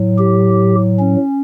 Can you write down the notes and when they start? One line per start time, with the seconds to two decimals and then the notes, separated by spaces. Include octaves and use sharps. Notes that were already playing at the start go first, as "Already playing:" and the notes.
Already playing: A2 F#3
0.19 G4
1.00 C#4